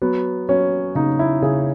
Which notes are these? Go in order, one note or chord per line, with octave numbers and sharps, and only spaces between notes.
F#3 B3
F#3 C#4
C#3 D#4
E4
C#3 G#4